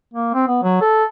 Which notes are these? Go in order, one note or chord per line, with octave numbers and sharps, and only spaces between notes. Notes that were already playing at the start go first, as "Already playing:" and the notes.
A#3
C4
B3
F#3
A4